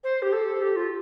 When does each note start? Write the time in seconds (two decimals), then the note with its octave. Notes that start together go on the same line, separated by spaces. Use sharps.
0.04 C5
0.22 G4
0.33 A4
0.62 G4
0.76 F4